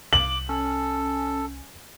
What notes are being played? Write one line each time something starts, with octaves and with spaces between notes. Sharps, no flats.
C2 D6 F#7
C#4 A4